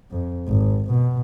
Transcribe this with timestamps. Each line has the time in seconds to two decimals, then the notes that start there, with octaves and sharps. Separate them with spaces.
0.11 F2
0.48 G#1
0.91 B2